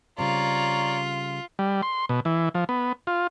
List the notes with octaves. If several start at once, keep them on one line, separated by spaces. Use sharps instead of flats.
C#3 G3 C4 F4 C#5 D5 A#5
G3
C6
B2
E3
F3
B3
F4